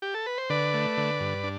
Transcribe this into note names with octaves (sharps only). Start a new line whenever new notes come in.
G4
A4
B4
C5
D3 B4 D5
A3
D3
G2
D4